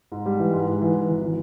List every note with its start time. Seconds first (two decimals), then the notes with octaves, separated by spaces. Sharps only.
0.12 G#2
0.26 G3
0.39 E3
0.53 G#2
0.67 G#2
0.81 E3
0.95 E3
1.09 G#1
1.22 E3